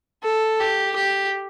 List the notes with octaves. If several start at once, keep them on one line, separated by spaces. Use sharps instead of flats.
A4
G4
G4